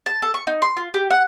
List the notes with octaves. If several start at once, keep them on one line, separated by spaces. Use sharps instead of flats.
A5
A4
C#6
D#4
C6
F4
G4
F#5